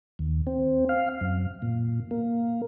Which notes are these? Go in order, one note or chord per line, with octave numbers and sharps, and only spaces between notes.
D#2
C4
F5
F#2
A#2
A#3